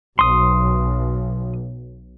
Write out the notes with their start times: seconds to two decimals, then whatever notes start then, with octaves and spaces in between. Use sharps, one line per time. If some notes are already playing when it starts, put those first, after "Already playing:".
0.19 B1 C6 D#6